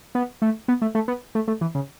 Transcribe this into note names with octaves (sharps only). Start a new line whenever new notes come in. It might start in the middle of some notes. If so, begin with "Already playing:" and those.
B3
A3
B3
A3
A3
B3
A3
A3
E3
C#3